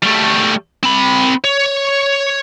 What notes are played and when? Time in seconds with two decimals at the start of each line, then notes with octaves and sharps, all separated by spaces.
0.02 G3 A3
0.83 C4 B5
1.44 C#5